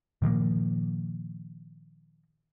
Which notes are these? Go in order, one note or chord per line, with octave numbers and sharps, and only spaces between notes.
A#2 D#3 F3 A#3